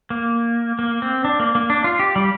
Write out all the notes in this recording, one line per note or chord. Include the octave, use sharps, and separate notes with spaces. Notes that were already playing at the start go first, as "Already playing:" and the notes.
A#3
A#3
C4
D4
A#3
A#3
D4
F4
G4
G3